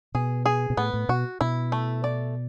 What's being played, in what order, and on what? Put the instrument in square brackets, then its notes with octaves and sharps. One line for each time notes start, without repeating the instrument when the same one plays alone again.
[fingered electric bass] B2 [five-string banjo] G#4
[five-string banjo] G#4
[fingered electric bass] B2
[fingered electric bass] A2 [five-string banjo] B3
[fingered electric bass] A2
[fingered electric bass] B2 [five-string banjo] F#4
[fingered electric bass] B2 [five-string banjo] E4
[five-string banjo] A3
D5